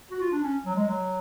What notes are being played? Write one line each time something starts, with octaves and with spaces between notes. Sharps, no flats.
F#4
F4
D4
C#4
F#3
G#3
F#3